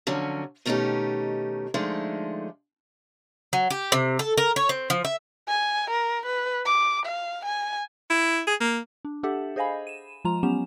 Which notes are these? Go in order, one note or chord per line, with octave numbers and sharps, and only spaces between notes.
D3 F3 F#3 C#4
B2 D#3 A3 C#4 D#4 G4
D3 F3 G#3 A3 D4 D#4
F#3
G4
C3
A4
A#4
C#5
C4
F3
E5
G#5
A#4
B4
D6
F5
G#5
E4
G#4
A#3
D4
D4 G4 A4 E5 F#5
G#4 C5 D#5 F5 G#5 B5
D#7 E7
F3 G#3 F4 A#5 F7
F#3 B3 C#4 G4 E7